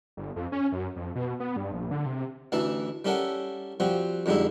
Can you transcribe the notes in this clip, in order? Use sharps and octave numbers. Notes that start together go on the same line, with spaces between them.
G1
F2
C#4
F#2
F2
B2
B3
G2
A#1
D3
C3
A1 D2 E3 E4 A5
G3 C#4 E4 A4 A#4 F#5
F3 G3 C4 F#4
F2 D3 G3 G#3 D#4 E4